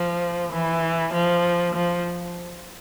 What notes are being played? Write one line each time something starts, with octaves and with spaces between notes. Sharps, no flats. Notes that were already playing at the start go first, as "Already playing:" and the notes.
Already playing: F3
E3
F3
F3